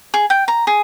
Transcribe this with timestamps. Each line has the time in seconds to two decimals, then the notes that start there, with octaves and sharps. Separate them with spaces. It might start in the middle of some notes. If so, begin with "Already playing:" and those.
0.14 G#4
0.30 G5
0.48 A#5
0.67 G#4